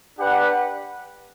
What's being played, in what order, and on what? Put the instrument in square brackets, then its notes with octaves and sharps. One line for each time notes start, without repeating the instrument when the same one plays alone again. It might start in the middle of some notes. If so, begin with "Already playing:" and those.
[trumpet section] D4 G4 B4 F#5